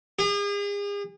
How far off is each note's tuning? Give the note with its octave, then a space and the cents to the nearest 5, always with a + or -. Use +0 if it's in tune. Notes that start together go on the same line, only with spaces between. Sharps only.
G#4 -40